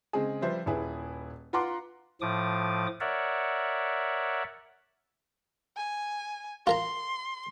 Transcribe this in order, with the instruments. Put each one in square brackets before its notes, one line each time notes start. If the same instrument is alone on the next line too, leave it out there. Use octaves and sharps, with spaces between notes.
[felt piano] C#3 G#3 C4 G#4
F3 G3 B4 C5 E5
D#1 E4 G#4 B4
F4 B4 F#5 A#5 C6 D6
[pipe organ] A2 F3 D6 D#6
A#4 C#5 D5 E5 F#5
[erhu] G#5
[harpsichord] F4 A#4 A#5 [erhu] C6